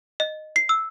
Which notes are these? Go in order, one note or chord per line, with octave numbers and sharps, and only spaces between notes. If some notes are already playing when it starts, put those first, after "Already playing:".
D#5
C7
E6